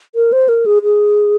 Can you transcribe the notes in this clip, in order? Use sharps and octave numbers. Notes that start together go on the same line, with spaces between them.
A#4
C5
A#4
G#4
G#4